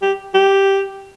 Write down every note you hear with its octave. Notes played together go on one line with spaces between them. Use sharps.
G4
G4